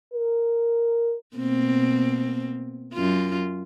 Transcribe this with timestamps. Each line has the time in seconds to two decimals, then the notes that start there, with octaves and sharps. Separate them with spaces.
0.13 A#4
1.37 B2 A#3 C4
2.94 F#2 F4